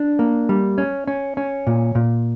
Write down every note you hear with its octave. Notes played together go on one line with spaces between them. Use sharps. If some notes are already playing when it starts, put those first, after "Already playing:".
Already playing: D4
A#3
G3
C#4
C#4
C#4
A#2
A#2